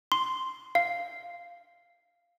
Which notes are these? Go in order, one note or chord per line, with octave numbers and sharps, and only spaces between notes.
C6
F5